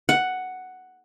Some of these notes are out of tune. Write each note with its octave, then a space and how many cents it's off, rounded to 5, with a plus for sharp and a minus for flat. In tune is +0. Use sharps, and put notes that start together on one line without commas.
F#5 +5